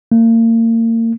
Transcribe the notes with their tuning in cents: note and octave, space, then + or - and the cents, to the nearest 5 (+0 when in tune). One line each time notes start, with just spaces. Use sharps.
A#3 -35